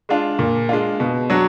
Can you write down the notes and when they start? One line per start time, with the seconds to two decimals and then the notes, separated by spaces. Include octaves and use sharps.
0.09 G#3 D4 F4
0.39 A#2
0.69 G#3 D4 F4
1.00 B2
1.30 F#3 D4 F#4